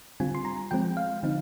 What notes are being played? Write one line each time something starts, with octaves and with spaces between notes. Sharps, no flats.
D3 G3 C4 F4 G#5
C6
A#5
F3 G#3 C4 G5
F5
D3 F3 C4 D#4